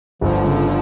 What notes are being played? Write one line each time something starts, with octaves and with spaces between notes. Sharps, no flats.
G1 D3 F3
C#3